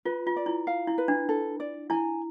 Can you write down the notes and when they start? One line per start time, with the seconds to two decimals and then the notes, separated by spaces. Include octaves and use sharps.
0.05 F4 B4
0.27 F4
0.36 D5
0.46 E4
0.67 F5
0.87 E4
0.98 B4
1.08 D4
1.29 A4
1.60 D5
1.90 E4 G#5